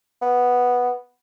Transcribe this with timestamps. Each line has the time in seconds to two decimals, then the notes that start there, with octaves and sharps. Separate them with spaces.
0.22 B3